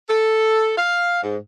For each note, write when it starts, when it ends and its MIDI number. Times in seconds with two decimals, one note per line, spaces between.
0.09 0.71 69
0.77 1.20 77
1.23 1.36 44